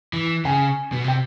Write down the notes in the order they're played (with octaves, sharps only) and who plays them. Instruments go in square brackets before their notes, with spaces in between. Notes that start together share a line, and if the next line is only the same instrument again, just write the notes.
[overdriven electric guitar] E3
[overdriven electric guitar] C#3 [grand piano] G#5
[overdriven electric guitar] B2
[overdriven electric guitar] C3 [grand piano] G5